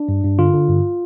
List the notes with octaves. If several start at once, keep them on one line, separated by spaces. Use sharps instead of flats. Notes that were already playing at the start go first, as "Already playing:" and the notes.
Already playing: D4
G2
G2
D3 F4
D3
G2